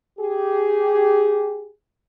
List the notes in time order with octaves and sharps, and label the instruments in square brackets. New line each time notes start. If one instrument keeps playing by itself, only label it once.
[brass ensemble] G4 G#4